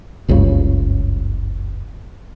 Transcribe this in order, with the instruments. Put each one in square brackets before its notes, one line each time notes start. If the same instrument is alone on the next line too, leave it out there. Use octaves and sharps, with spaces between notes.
[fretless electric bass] F#1 C#2 G2 C#3